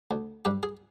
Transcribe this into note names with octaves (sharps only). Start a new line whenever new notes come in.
D2
G2 G4
G#4